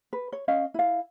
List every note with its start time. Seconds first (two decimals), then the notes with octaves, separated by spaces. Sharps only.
0.13 B4
0.32 C#5
0.48 C#4 D#5 F5
0.74 E4 F5